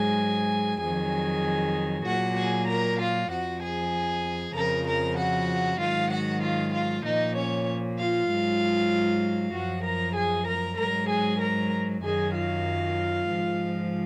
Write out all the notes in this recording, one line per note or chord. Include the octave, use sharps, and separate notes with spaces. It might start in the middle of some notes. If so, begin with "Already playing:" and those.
Already playing: G#2 F#3 G#4 G#5
F2 D#3 F#3 G#4 G#5
A#2 F#3 F#4 F#5
G#4 G#5
A#4 A#5
F4 F5
F2 F3 F#4 F#5
G#4 G#5
F2 C#3 F3 A#4 A#5
A#4 A#5
F#4 F#5
G#2 D#3 F#3 F4 F5
F#4 F#5
F4 F5
F4 F5
A#2 F3 D#4 D#5
C#4 C#5
F4 F5
G#2 F#3
F#2 F3 F#4 F#5
A#4 A#5
G#4 G#5
A#4 A#5
G#2 F#3 A#4 A#5
G#4 G#5
A#4 A#5
F#2 D#3 F#3 G#4 G#5
F4 F5
G#2 F3